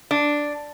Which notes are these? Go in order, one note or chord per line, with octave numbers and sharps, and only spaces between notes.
D4